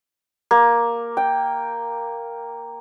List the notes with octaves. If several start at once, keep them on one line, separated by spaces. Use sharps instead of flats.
A#3
G5